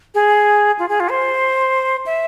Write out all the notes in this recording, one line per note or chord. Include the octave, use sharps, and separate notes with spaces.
G#4
F4
G#4
F4
C5
E5